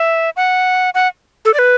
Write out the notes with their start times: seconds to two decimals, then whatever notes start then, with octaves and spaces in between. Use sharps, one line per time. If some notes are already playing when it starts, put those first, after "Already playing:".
Already playing: E5
0.36 F#5
0.94 F#5
1.45 A4
1.54 D5
1.59 B4